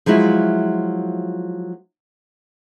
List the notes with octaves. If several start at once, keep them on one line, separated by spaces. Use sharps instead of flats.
F3 F#3 G#3 E4 F4